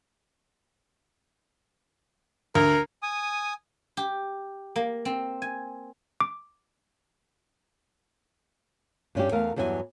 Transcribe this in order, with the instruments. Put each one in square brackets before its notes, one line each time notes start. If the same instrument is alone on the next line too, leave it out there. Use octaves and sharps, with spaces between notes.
[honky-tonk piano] D2 [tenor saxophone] A#4
[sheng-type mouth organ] G#5 D#6
[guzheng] G4
A#3
C4
G#5
[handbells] D6
[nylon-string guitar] G2 C#4 D4 G4
E2 A3 A#4 F5
E2 G2 F#3 E4 G5 G#5